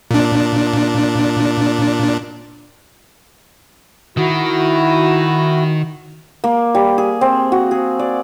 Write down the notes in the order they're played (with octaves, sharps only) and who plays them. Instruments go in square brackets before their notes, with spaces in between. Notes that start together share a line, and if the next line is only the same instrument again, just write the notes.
[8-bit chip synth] A#2 D4
[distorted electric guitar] D#3 [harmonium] E4 F#4
[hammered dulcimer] A#3
G3
G#4
C4
F#4
G#4
D5